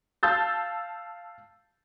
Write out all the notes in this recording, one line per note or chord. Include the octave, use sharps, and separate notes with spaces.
F5 A5 E6 G6 A6